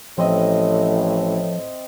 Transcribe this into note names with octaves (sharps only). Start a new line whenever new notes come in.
A1 A2 F3 C4 D#5 E5